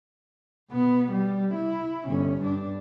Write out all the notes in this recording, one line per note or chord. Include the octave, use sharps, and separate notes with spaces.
B2 B3
G3
E4
G1 C#4
G2 D4